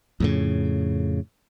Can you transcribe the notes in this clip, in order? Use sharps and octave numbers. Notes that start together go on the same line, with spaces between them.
F2 A2 C#3